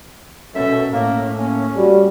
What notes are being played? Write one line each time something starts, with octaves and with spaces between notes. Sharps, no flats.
F#2 B2 C#4 A4 E5
A2 A#3
A#3 C#4
G3 F#4